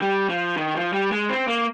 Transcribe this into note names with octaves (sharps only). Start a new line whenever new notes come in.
G3
F3
D#3
F3
G3
G#3
C4
A#3